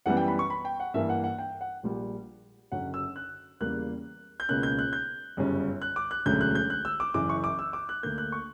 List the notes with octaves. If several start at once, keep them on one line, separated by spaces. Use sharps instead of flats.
F#2 E3 G3 B3 F#5
G5
B5
C#6
B5
G5
F#5
G2 E3 A#3 E5
F#5
F#5
G5
F#5
A#1 A#2 G3
F#1 F#2 D3 F#3 C#4 F#5
E6
F#6
E2 C#3 G3 A#3 F#6
G6
C#2 B2 A#3 C#4 F#6
G6
F#6
G6
G1 F#2 C#3 G3 C#4
F#6
D6
F#6
E1 D2 D3 F#3 C#4 G6
F#6
G6
F#6
E6
D6
F#1 F#2 E3 D6
C#6
D6
E6
D6
F#6
D2 D3 A#3 G6
F#6
C#6